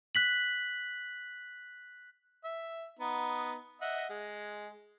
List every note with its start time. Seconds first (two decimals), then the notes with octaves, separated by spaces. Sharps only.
0.15 F#6 B6 F#7
2.44 E5
2.99 B3 D#4
3.81 D#5 E5 F#5
4.09 G#3